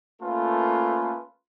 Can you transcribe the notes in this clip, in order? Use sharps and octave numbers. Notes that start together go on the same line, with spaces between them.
A3 A#3 C#4 F4 A4 B4